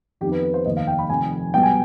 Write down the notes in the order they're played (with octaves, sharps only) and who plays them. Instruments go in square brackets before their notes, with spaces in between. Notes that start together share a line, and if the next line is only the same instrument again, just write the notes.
[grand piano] F2 D#3 B3 D#4 G4
B4
B4
C5
F1 D#2 D#3 D#5
F5
G5
B5
F1 F2 D#3 G#5
B1 B2 G3 B3 G5
G#5